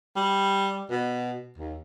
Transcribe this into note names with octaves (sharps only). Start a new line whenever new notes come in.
G3
B2
D#2